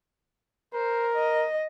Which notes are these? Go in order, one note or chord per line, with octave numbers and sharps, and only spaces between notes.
A#4 C5
D#5